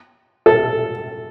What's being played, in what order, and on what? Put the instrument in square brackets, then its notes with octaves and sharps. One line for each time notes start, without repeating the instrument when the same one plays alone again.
[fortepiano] A4